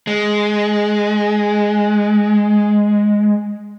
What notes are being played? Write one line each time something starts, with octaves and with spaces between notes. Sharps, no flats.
G#3